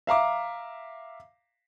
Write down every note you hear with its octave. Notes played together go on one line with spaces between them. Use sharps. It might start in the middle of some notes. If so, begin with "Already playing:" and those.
E5 F5 A#5 D6